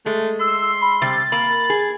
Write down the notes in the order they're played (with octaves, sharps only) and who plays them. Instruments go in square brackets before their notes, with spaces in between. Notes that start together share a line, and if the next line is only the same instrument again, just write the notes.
[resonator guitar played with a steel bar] G#3 [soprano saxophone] A3
[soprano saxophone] C6 [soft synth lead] E6
[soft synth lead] B5
[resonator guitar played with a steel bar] C3 G3 [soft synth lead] A6
[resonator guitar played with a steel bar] A#3 [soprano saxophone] B5
[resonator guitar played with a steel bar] G#4